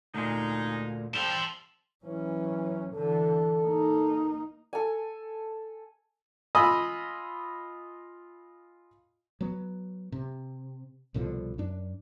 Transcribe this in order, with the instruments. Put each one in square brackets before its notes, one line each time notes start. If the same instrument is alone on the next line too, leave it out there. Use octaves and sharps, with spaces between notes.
[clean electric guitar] D2 A#2 [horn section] G#3 D#4
[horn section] G3 C4 A4 [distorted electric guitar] A5 C6 [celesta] E7
[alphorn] E3 [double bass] F#3 C#4
[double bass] D3 E3 [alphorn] A4
[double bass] A#3 D#4
[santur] A4 G#5
[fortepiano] F4 D#5 G#5 B5 D#6 E6
[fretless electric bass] F#3 B3
C3
C2 B2 D3 F3
F#2 D4